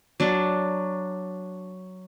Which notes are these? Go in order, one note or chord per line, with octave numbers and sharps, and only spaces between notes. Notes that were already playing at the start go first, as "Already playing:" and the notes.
F#3 D4